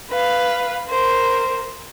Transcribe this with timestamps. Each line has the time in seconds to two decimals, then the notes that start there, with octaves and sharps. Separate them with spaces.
0.11 B4 F5
0.89 A#4 C5